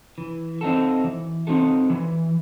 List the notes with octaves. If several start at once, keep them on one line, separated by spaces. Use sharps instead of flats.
E3
C4 D#4 F#4 A4
E3
C4 D#4 F#4 A4
E3